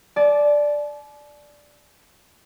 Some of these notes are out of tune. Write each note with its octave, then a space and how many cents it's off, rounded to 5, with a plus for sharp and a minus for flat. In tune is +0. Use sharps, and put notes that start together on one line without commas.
D5 +0 A5 -40